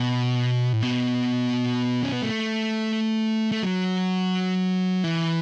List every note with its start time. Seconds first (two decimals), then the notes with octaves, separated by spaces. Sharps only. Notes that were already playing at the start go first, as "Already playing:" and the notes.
Already playing: B2
0.73 A2
0.82 B2
2.03 C#4
2.13 B3
2.22 A3
3.52 A3
3.63 F#3
5.04 E3